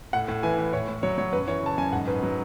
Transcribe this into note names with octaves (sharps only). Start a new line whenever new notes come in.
A2 F#5
A2
E3 G#5
E3
A2 C#5
A2
F#3 C#5
F#3 C#5
F#2 B4
E3 C#5
C#3 A5
F#2 G#5
G#2 F#5
G#2 B4
F#3